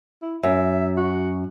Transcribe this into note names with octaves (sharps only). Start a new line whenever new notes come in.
E4
F#2 E5
F#4